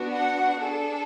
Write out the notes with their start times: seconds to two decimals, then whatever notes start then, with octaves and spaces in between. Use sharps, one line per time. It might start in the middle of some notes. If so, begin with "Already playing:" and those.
Already playing: B3 D4 F#4
0.14 F#5
0.60 D4 G#4 A4